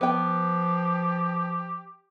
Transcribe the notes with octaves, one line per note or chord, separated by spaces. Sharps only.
F3 B3 G4 G5